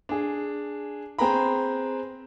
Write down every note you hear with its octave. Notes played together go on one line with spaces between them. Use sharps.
D4 G#4
C4 G#4 B4 G5 A#5 B5